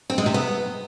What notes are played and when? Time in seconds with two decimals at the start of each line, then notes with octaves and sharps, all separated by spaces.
0.10 C4
0.18 G#3
0.26 C3
0.34 B3